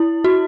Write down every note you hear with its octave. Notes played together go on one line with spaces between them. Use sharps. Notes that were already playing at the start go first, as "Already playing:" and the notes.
Already playing: E4
F#4